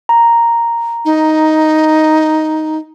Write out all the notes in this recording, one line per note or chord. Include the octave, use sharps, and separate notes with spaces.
A#5
D#4